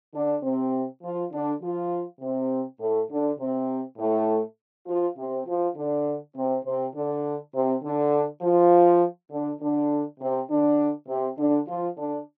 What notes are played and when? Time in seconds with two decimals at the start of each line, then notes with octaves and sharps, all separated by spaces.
0.14 D3 D4
0.43 C3 C4
1.03 F3 F4
1.32 D3 D4
1.62 F3 F4
2.20 C3 C4
2.80 A2 A3
3.09 D3 D4
3.39 C3 C4
3.98 A2 A3
4.87 F3 F4
5.17 C3 C4
5.47 F3 F4
5.76 D3 D4
6.35 C3 C4
6.64 C3 C4
6.94 D3 D4
7.54 C3 C4
7.83 D3 D4
8.42 F3 F4
9.31 D3 D4
9.61 D3 D4
10.20 C3 C4
10.50 D3 D4
11.08 C3 C4
11.38 D3 D4
11.67 F3 F4
11.97 D3 D4